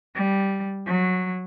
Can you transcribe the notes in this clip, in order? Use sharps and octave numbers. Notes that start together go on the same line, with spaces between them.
G3
F#3